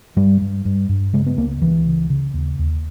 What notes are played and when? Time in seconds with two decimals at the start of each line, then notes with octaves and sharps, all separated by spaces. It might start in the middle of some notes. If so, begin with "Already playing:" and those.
0.16 G2 G3
0.41 G2
0.65 G2
0.89 G2
1.13 C#3 G#3
1.26 B3
1.37 C#2 A#3
1.61 C#2 E3
1.87 C#3
2.10 C#3
2.34 D#2
2.59 D#2